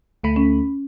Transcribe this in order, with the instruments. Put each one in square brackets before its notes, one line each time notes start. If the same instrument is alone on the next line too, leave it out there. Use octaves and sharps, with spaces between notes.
[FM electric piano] D2 A3 B5
[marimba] C#4